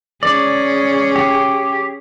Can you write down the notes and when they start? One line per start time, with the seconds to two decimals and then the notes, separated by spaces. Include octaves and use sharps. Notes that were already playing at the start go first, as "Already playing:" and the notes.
0.23 C#4 G#4 D5
1.16 G4